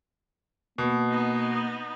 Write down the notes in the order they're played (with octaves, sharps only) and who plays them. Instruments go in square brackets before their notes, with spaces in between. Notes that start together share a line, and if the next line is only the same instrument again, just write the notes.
[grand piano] B2 [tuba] A#3
[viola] B3 D#4